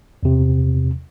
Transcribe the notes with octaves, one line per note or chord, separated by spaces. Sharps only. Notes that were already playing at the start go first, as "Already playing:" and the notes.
E2 C3